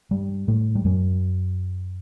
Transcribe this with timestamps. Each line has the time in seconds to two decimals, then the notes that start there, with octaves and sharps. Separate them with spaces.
0.11 G2 G3
0.48 A2 A3
0.75 G3
0.85 F#2 F#3